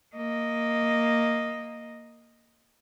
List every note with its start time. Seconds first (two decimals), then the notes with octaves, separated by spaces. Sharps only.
0.16 A#3 D#5